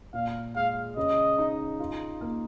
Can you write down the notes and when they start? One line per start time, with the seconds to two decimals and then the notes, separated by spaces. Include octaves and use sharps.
0.14 A#2 F5
0.55 G#3 F5
0.97 C#3 D#5
1.38 D#4
1.80 F4
2.21 A#3